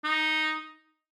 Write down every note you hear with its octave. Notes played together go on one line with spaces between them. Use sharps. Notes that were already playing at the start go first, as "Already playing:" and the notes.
D#4